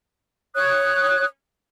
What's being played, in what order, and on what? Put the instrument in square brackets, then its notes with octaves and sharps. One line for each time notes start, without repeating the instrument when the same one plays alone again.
[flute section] C#5 D#6 F#6